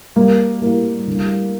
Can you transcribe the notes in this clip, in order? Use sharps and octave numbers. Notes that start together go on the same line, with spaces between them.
G3 A#3
A2 A#3
D3